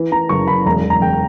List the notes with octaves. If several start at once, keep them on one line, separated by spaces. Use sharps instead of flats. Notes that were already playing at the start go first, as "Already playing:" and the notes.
Already playing: E3
E3 A#5
F#1 C#6
F#1 B5
E1 A#5
E1
A#5
E1 G5